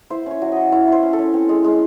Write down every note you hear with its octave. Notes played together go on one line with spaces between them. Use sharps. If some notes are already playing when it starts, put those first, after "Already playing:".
E4 C5
C#4 C#5
F#3
E4 D#5
E4 C#5
E4 C5
C#4
A4
C#4
C4
G#3
G#3